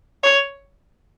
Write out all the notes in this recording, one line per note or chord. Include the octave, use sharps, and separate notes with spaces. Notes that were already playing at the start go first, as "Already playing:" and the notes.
C#5